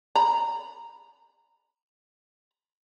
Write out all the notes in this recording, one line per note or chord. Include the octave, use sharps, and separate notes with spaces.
A#5 B5